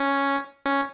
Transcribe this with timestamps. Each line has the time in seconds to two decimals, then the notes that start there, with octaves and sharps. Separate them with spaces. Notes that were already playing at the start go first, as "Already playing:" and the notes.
Already playing: C#4
0.66 C#4